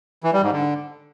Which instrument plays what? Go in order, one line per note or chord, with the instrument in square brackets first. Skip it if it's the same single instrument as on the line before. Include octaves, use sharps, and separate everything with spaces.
[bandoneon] E3
G3
G#2
D3